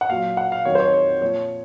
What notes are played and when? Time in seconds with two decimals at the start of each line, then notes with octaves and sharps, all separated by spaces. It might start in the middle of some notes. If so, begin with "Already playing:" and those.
0.01 F#5
0.09 A#2 F#3 F5
0.37 F#5
0.52 F5
0.65 F2 D#3 F#3 C#5
0.75 C5
0.80 C#5
0.94 C#5
1.21 A#2 F3 C#5